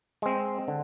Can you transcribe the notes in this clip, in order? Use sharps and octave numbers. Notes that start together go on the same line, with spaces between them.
G#3 C4
D3